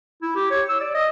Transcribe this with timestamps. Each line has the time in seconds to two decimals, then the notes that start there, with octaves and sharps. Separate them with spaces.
0.22 E4
0.36 G4
0.50 C#5
0.69 E6
0.81 D5
0.94 D#5